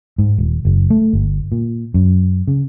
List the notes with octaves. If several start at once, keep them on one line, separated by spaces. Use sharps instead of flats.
G#2
D#1
F#1
A3
G1
A#2
F#2
C#3